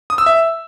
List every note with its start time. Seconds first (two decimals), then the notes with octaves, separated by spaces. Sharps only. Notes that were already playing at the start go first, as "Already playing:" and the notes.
0.10 D#6
0.18 E6
0.26 E5